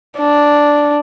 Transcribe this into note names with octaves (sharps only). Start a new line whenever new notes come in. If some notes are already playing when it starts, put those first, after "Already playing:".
D4